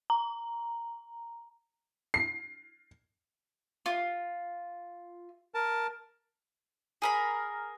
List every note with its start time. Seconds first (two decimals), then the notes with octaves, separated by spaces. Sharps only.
0.10 A#5
2.14 C7
3.86 F4
5.55 A#4 A5
7.02 G#4 A#4 B5